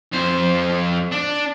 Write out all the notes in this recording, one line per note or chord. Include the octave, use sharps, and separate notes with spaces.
F2 C5
D4